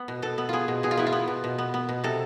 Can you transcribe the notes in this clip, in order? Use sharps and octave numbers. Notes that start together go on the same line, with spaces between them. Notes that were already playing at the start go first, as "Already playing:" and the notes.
Already playing: B3
B2
B2 A4
B3
B3 F4 G#4
B2
B2 G#4
F4
B3 E4
F4
B3
B2
B2
B3
B3
B2
C3 A4